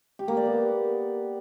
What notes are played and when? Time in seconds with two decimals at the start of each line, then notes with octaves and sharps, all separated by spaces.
0.19 G4
0.28 A#3
0.37 D5
0.46 B3